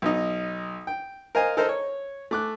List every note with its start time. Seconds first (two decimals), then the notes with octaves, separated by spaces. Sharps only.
0.02 B1 D#4
0.87 G5
1.35 A#4 C5 D#5 F5 G#5
1.57 A4 A#4 C5 D#5
1.69 C#5
2.31 A3 D6 F#6